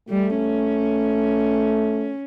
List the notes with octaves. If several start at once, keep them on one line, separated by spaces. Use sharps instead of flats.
G3 A3
C#4